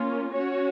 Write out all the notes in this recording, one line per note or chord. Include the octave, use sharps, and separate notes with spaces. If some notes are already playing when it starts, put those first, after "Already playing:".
Already playing: A#3 C#4 F4
C#4 F#4 C#5